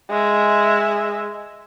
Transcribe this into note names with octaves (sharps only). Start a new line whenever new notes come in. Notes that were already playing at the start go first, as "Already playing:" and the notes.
G#3 E5